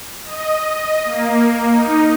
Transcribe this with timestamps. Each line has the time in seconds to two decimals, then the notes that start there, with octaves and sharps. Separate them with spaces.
0.24 D#5
1.05 A#3
1.71 D#4